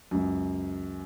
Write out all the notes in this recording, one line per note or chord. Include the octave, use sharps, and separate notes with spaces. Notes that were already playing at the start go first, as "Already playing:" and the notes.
C#2 F#2